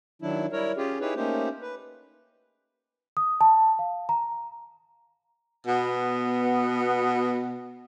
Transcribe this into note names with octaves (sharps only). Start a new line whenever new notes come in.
D#3 F#3 D4 E4
G3 E4 A#4 C#5
C#4 F4 G4 G#4
D#4 E4 G4 G#4 B4 C#5
A3 A#3 C#4 D#4 G4 C5
B4
D#6
A5
F5
A#5
B2 B3